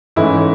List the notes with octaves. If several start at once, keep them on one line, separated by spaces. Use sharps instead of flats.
G#2 E3 A3 C#4 E4